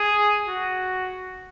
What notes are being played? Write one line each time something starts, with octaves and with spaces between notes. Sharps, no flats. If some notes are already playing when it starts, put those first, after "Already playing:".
Already playing: G#4
F#4